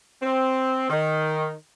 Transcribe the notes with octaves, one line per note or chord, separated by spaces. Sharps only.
C4
D#3